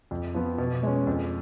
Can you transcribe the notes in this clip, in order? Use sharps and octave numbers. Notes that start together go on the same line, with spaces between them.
F2
F3 B3
B2
G#3 C#4
F2